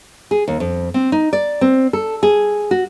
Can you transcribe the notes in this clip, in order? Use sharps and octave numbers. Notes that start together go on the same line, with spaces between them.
G#4
D#2
F2
C4
D#4
D5
C4
A4
G#4
F#4